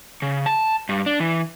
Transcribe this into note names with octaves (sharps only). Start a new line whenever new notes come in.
C#3
A5
G2
D4
E3